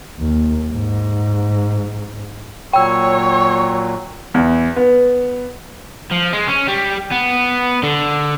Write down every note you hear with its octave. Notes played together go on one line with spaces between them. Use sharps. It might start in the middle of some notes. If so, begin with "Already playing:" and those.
D#2
G#2
A#2 F#3 C#5 G5 E6
E2
B3
F3
G#3
C#4
G3
B3
D3